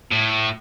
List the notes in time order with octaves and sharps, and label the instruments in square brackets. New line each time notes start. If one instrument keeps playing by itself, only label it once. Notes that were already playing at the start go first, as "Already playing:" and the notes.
[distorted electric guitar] A2